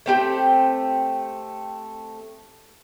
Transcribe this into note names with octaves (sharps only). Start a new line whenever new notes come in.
A3 C4 G4 G5